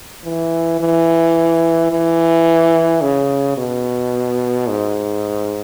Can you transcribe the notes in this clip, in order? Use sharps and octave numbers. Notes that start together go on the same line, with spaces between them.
E3
E3
E3
C#3
B2
G#2